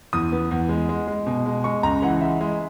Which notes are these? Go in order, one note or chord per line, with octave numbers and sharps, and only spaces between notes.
E2 D#6
B3
E2
G#3
G#3
G#3
B2
G#3
G#3 C#6
C#2 A#5
E3 F#5
G#3 E5
G#3